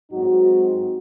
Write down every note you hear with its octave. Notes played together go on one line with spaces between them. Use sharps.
G#2 F#3 C4 D#4 F#4